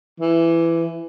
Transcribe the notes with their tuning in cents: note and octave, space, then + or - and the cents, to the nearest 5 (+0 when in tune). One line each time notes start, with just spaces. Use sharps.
E3 +15